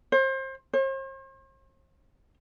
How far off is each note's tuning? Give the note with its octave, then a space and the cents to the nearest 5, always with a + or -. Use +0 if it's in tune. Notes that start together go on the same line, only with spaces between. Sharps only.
C5 +30
C5 +45